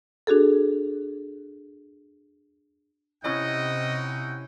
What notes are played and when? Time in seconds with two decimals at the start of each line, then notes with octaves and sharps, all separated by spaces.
0.27 D4 F#4 G#4 A4
3.24 C3 C#4 D#4 E4 D#5 F#5 G5 D#6